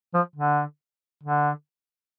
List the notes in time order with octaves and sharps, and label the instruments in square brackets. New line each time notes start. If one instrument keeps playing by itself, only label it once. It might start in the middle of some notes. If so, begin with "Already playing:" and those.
[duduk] F3
D3
D3